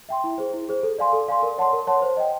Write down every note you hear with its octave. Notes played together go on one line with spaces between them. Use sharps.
E5 G5 C6
E4
G#4 C5
E4
G#4 C5
A4
D5 F5 G#5 C6
A4
D5 F5 G#5 C6
A#4
C#5 F#5 A5 C6
A#4
C#5 F#5 A5 C6
C5
D#5 G5